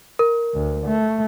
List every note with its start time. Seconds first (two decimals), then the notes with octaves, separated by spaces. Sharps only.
0.19 A#4
0.54 D2
0.87 A3